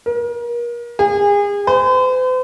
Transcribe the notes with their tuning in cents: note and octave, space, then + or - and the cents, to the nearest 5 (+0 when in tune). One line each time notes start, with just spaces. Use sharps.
A#4 +35
G#4 -35
C5 -45